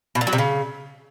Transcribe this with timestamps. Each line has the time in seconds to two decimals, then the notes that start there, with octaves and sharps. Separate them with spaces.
0.15 B2
0.21 A#2
0.27 F#3
0.33 C3
0.38 C#3